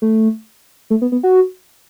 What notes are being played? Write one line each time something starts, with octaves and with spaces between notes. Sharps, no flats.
A3
A3
B3
B3
F#4